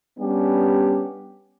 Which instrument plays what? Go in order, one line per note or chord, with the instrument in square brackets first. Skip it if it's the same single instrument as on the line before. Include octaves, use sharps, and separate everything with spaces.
[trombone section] G3 B3 C#4 D4 G4